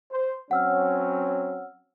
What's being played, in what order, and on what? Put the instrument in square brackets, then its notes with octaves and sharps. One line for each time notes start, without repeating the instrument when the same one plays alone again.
[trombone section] C5
[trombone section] F#3 C4 C#4 [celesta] F#5 E6 F6